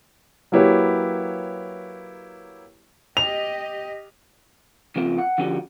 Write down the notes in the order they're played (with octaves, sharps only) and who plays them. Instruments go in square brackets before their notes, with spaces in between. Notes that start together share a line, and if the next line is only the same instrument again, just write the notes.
[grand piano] F#3 A#3 E4 G4 B4 C#5
[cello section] G4 D#5 [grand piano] F7
[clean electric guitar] C#3 F3 C4 F4
F#5
D3 F3 C#4 F#4 G4